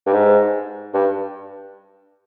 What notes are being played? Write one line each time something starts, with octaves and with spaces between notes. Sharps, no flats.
G2
G#2
G2